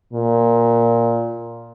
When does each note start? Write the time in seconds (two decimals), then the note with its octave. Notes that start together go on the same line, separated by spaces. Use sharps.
0.13 A#2